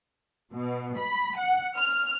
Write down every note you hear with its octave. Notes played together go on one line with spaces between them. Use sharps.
B2
B5
F#5
F6